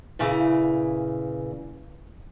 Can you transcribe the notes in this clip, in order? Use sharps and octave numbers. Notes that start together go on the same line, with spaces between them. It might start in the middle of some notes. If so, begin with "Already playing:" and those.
A#2 C#3 E3